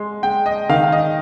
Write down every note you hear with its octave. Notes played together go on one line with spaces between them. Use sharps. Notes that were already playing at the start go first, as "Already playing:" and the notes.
Already playing: G#3 C6
G#3 G5
D#5
D#3 F5
F5
D#5